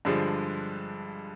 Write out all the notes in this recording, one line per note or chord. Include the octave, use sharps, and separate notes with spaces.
G2 D3 F3 G#3